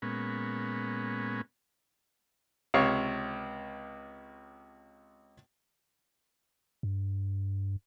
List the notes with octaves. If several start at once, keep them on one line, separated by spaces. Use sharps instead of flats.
A#2 G#3 B3 C#4
C#2 C3 C#5 F5
G2